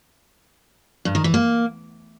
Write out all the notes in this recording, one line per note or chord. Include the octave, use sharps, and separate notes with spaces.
G2
D#3
E3
A#3